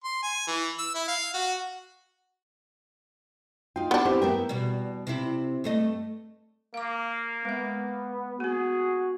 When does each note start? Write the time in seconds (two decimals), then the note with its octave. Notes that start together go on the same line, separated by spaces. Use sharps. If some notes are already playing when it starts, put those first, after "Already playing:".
0.04 C6
0.23 G#5
0.48 E3
0.79 E6
0.95 E4
1.08 F5
1.34 F#4
3.76 D#4 F4 G5
3.91 B3 D4
4.05 C4 E4 G4 C5
4.22 A3 B3 A#4 G5
4.49 E2 B2 G3
5.07 C3 E4
5.64 G2 A3 D#5
6.74 A#3 F5 D6
7.45 G#3 B3 E5
8.40 A#3 B3 F#4 G#4